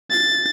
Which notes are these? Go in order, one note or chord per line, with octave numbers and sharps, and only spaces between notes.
A6